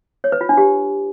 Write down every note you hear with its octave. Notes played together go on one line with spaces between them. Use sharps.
C#5
B4
F4
D4
G4